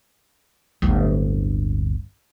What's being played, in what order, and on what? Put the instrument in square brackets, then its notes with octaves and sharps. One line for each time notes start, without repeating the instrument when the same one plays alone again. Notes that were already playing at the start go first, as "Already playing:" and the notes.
[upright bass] D1 G1